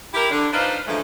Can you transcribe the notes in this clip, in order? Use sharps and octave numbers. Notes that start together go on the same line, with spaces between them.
E4 G4 A#4
D3 D4
D4 D#4 F4 B4 C5
F#2 D3 E3 F3 G#3 A3